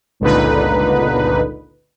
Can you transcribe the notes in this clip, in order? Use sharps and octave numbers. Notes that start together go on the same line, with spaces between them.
G1 C#2 A#2 D3 D#4 B4